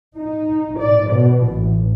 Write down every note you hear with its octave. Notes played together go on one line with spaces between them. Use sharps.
D#4
D5
B2
A1